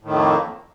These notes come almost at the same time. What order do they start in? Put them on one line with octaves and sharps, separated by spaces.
A2 D#3 F2 A3 A#3